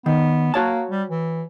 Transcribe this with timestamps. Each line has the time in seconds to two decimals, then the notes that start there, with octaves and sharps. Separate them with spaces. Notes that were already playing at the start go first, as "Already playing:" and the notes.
0.06 D#3 B3
0.54 A#3 F#4 C#5 A5
0.90 G3
1.10 E3